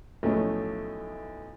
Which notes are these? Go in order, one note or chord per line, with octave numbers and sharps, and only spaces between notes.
B1 A2 F3 A3 C#4